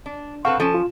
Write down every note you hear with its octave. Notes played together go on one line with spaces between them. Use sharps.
D4
C4 A4 B4 F5 F#5 C#6
F3 C#4 A4 A5
F4